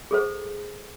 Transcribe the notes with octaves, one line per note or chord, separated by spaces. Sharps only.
G#4 A4 C5